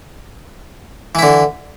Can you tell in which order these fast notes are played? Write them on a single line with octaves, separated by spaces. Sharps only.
E3 E4 D3